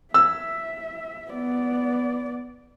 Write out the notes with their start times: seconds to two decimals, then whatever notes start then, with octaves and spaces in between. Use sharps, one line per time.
0.14 E5 E6
1.31 B3 D5